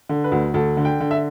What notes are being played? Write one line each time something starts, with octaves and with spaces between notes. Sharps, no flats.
D3
B4
D2
D2 A4
D3
G5
D3
E5